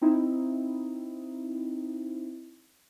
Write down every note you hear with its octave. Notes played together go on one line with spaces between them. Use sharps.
C4 D#4 E4